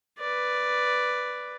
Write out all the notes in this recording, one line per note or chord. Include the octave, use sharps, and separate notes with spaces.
B4 D5